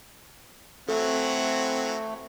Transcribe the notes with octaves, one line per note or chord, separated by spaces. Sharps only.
E3 F#3 A3 C4 F#4 A4